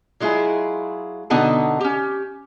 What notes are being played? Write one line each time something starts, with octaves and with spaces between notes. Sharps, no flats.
F#3 G#3 E4 F4 G#4
B2 D3 B3 D#4 F#5 A5
C#4 G4